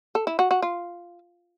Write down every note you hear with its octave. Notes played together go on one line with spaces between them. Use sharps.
A4
E4
F#4
F#4
F4